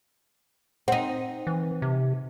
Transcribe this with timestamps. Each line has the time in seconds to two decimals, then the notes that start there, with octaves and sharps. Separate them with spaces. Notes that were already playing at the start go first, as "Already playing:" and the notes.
0.88 C4 D#4 F#5
1.47 E3
1.82 C3